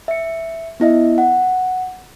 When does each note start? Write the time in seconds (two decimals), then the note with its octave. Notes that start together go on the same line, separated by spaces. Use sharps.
0.08 E5 C#7
0.80 B3 E4 D#5 E5
1.18 F#5